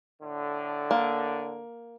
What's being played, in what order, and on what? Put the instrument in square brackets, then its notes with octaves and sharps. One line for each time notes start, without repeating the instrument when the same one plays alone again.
[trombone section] A2 D3
[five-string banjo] A#3